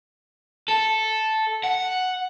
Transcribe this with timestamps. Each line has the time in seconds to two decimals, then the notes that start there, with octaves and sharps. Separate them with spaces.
0.68 A4
1.63 F#5